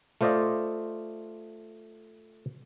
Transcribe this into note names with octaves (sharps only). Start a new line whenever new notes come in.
A3 F4 C5 D5 D#5 F5